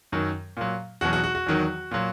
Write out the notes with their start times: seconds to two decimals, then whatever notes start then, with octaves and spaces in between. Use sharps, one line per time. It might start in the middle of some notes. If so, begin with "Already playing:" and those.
0.12 F#2 D#3 F#3
0.57 A#2 F#3
1.01 E2 B2 F#3 F#4
1.13 F#4
1.24 F#4
1.35 F#4
1.46 E2 D#3 F#3
1.91 A#2 F#3